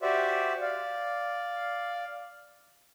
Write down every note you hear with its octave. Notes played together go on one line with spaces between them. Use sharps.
F#4 G4 C5 D5 E5
D5 F5